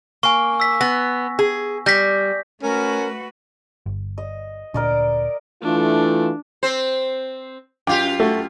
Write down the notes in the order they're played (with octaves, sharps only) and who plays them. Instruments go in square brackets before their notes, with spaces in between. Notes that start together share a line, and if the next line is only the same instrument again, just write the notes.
[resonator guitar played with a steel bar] A#3 [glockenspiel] G#5 C#6
[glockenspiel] E6 B6
[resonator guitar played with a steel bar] B3 [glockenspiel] A#6
[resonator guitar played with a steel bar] G#4
[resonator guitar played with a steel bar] G3 [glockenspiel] G6 A#6 B6
[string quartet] A3 F#4 B4 [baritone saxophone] C#4 [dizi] A#4
[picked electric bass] G1
[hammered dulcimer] D#5
[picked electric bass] D2 A#2 D4 [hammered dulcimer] A#4 D5 D#5
[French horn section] E3 A3 F4 [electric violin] D4
[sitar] C4 C5
[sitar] F#2 F4 G4 [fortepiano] G5 D6
[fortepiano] A3 F#4